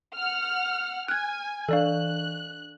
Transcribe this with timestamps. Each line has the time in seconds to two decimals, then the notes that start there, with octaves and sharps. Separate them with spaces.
0.17 F#5 F6
1.08 G#5 F6 F#6 G#6
1.69 E3 D4 A4 D5 F5 F#6